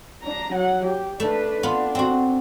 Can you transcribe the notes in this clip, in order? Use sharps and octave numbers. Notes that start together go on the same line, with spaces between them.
D4 A#5
F#3 F#5
G4
A3 D4 B4
B3 D4 F4
C4 F#4